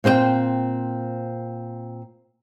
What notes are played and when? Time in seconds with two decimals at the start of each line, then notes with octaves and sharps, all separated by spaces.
0.04 A#2 C4 C5 D5 G5